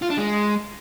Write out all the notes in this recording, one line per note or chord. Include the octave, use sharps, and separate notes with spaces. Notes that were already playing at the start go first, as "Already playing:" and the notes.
F4
D4
G#3